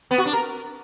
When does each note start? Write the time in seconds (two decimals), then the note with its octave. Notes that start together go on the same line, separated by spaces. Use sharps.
0.11 B3
0.18 F#4
0.26 D4
0.33 A#4